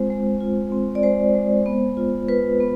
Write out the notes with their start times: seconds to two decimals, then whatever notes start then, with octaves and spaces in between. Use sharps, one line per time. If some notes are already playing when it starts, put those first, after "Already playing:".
Already playing: G#3 C4 F4 C5
0.10 G#3
0.41 F4
0.72 C4
0.95 D5
1.03 G#3 C5
1.35 G#3
1.66 B3
1.97 F4
2.29 F4 B4
2.60 B3